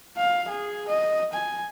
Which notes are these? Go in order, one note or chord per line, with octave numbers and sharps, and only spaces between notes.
F5
G#4
D#5
G#5